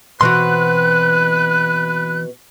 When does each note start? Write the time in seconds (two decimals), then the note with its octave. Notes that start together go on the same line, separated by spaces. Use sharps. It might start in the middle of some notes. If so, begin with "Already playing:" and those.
0.21 B2 E3 C4 F#4 B4 C6 F#6